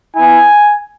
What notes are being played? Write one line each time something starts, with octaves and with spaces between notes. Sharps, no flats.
B3 E4 G#5